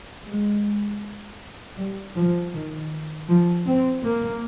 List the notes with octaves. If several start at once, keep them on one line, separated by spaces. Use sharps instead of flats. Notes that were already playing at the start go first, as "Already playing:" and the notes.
G#3
G3
F3
D#3
F3
C4
A#3